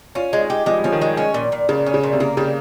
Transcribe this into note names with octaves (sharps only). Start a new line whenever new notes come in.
C#4 F4
G#3
D#4
G4
F3 G#3
G3
F3 C#4
D#3
G#3
C#4
A#2
A#2
A#2 C#3
C#4
C#3
A#2
C3
C#3 A#3
C#3 G3